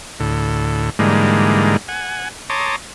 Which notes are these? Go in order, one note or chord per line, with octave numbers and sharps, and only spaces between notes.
D2 A2
G#2 D3 E3 G3 G#3 A#3
F#5 G#5
C#5 A5 A#5 C6 D6 D#6